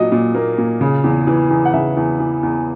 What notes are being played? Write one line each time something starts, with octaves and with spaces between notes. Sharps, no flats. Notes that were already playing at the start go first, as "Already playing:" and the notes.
Already playing: A#2 F#3 D#5
A#2
A#3
A#2
C#3
E2
E3
E2
F#5
C#3 E5
E2
E3
E2